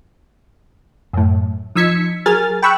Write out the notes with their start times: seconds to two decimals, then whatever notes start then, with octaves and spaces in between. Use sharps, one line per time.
1.13 F#2 A2
1.75 F3 D#4 E6 G#6 B6 C#7
2.26 F#3 G#4 A#4 G#5 F6 A6
2.62 G5 B5 C#6 E6 F#6